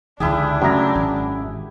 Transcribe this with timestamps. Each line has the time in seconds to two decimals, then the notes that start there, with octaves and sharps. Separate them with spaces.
0.20 C#2 D3 D#3 D4 E4 G4 G#4
0.62 F#2 C#3 A3 A#5
0.95 G#1